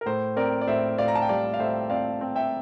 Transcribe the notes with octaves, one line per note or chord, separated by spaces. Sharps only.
A#4
A2 C5
C4 A#4 D5
D5
A2 C5 E5
A2 D5 F5
A#5
A5
G5
G3 D5 F5
F5
A2 C5 E5
C4 D5 F5
C4
E5 G5